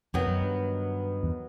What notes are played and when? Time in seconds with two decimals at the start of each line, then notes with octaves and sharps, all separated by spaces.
0.14 F2 D#3 F#3 B3
0.27 F#2
0.41 G2
1.23 E2